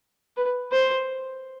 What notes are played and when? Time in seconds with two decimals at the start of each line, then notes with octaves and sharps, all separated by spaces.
0.37 B4
0.72 C5